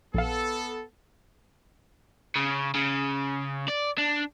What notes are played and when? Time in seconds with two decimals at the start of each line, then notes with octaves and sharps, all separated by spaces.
0.14 A#1 B3 A4 F5
2.36 C#3
2.75 C#3
3.69 D5
3.98 D4